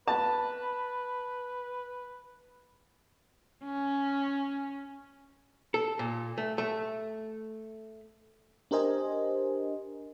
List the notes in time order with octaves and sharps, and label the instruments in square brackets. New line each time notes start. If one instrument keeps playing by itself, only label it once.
[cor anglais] B4 [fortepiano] A5
[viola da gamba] C#4
[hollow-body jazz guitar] A4
A#2
A3
A3
[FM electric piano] D4 G4 A#4 C5 D#5 G#5